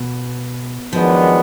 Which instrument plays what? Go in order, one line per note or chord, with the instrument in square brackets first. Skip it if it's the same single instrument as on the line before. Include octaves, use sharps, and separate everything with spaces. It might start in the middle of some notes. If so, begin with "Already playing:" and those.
Already playing: [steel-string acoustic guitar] B2
[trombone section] F#2 D#3 G#3 B3 D4 [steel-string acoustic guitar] F3